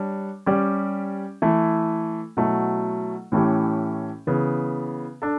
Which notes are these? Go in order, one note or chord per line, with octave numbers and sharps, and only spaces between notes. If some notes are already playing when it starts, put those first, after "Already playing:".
Already playing: G3 D4 C#5
G3 C#4 G4 D5
E3 A3 E4
B2 F#3 A3 E4
A2 E3 A3 C#4 G4
C#3 E3 B3
D4 A4